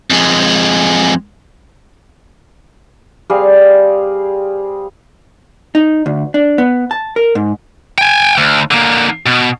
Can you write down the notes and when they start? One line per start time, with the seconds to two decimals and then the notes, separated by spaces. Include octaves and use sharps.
0.10 F2 G#3
3.30 G3 C4 G#4 F5
5.75 D#4
6.06 D2
6.34 D4
6.58 B3
6.91 A5
7.16 A#4
7.35 G#2
7.98 G5 G#5
8.38 D2
8.71 D3 A#3
9.26 B2